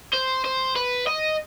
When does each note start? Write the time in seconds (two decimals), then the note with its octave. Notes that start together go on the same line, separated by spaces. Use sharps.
0.13 C5
0.44 C5
0.76 B4
1.07 D#5